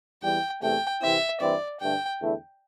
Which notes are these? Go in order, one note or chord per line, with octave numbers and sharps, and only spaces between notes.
E2 E3 G3 G5
E2 C3 A3 G5
C3 E3 C4 E4 E5
G2 E3 C4 E4 D5
G2 D3 A3 G5
E2 D3 A3 E4